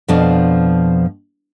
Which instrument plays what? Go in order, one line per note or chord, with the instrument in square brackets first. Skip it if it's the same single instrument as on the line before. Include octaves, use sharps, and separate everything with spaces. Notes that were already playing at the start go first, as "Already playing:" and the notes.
[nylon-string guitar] F2 B2 F3 D4